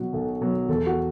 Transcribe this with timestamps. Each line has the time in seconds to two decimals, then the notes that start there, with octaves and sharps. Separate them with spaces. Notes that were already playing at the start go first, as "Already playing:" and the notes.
Already playing: B2 F#3 F#4
0.13 B1 A4
0.41 B2 F#3
0.68 E2 A4
0.87 F#4